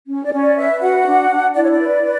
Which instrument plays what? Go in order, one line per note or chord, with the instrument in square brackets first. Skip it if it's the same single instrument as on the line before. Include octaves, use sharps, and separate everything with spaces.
[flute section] C#4
D5
C#4
D5
B4 E5
F#4 F#5
D4
D4
E4 D5
C#5
D5
B4
B4